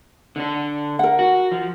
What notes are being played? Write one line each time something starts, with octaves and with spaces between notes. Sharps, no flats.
D3 D4
A#4 F#5
F#4
F3